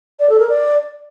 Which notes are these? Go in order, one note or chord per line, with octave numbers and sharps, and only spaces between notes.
D5
A4
A#4
D5